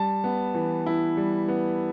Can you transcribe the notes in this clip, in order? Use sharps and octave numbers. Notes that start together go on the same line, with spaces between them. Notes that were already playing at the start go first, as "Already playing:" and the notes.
Already playing: G3 A5
B3
E3
E4
G3
B3